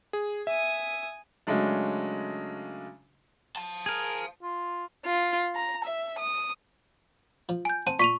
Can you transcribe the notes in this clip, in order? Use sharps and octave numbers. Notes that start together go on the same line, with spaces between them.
G#4
E5 G#5 D#6
C#3 F#3 G#3 A3 D4
F5 A5
G#4 A#4
F4
F4
A#5
E5
D#6
F3
G#5 G6
C4 F#5 A5 D#7
A#2 C#6 B6 D#7 F7